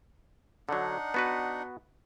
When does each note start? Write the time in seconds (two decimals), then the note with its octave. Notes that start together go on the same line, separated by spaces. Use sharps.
0.69 D3 F#3 D4 D#4 F#5
1.14 B3 F#4 B4